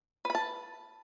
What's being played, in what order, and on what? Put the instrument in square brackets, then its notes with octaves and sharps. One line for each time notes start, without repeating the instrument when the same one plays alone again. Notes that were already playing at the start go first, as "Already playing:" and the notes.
[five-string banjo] B4
B5
A5